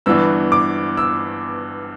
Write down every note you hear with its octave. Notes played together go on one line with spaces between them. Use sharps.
G1 G2 E3 B3 D4 E6
D6
E6